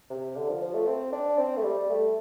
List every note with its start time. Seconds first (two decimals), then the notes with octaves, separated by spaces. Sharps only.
0.10 C3
0.36 D3
0.49 F3
0.62 F3
0.75 A3
0.87 C4
1.12 D4
1.38 C4
1.57 A3
1.64 G3
1.89 A3